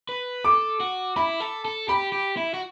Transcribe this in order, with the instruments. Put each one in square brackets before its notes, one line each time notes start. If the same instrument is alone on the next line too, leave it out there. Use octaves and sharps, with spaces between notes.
[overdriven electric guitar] B4
[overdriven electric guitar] A4 [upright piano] D6
[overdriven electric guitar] F#4
[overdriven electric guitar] E4 [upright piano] B5
[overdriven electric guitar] A4
A4
[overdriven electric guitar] G4 [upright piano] B5
[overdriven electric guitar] G4
E4
F#4